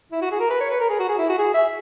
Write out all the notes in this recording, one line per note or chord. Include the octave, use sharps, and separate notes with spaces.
E4
F#4
G#4
A#4
B4
C#5
B4
A#4
G#4
F#4
G#4
E4
F#4
G#4
E5